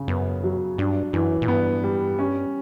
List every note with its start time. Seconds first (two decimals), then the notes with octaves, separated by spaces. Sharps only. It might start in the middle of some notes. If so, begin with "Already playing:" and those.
Already playing: C#3
0.08 F#2 B3
0.44 F#3
0.78 G2 D4
1.13 F#2 E3
1.42 A#2
1.48 G2 B3
1.84 G3
2.19 C#4